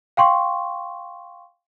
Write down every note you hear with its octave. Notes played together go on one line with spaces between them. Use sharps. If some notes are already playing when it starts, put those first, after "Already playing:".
F5 G5 C6 C#6